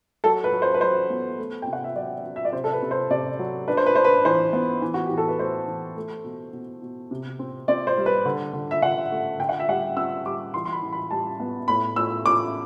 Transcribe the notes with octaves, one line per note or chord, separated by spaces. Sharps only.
F#3 A4
B4
F#3
C5
B4
F#3 C5
B3
A3
C3 G5
F#5
E5
F#3 D5
F#3
E5
D5
C3 C5
A4
B4
C3
C5
C3 D5
F#3
D4 B4
C5
B4
D4 C5
B4
E3 C5
B3
E3
F#4
G4
E3
A4
B4
A3 C5
E3
A3
B2
B2
B2
C3
C4
C4 D5
C5
G3
B4
D3
D3
E5
D3 F#5
A3
D3 G5
F#5
E5
G3 F#5
C4 E6
G3 D6
E3 C6
C6
B5
E3
B5
G3 A5
B3
A2 B5
A2 E6
A2 D6